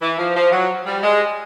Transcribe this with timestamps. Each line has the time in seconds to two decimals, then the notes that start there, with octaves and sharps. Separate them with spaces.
0.02 E3
0.19 F3
0.35 F3
0.52 F#3
0.86 G3
1.03 G#3